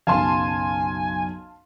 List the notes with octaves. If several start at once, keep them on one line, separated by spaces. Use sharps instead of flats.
F#1 B1 F5 G#5 A5 C6